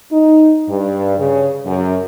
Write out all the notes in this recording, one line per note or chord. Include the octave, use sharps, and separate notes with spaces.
D#4
G2
C#3
F#2